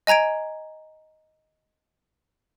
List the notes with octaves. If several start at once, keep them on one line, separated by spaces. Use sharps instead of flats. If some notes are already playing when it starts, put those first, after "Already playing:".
D#5 G#5 A#5 G#6 D7